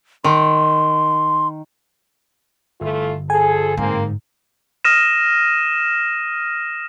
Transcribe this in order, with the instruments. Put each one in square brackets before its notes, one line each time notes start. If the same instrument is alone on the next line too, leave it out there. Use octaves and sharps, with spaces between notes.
[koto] D#3 [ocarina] C6
[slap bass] G1 [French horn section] E3 A3 F4
[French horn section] F3 G#4 A4 [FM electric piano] G#5
[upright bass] G#2 [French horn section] A#3 C4
[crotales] D#6 F6 A#6 D#7 E7